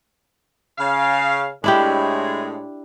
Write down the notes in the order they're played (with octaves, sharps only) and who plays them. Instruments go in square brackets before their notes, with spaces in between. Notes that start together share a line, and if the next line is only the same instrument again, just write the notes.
[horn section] C#3 F5
[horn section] A2 G#3 [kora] D4 E4 G4